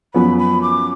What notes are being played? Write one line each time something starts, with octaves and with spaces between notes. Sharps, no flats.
F#2 F3 B3 B5
B5
D6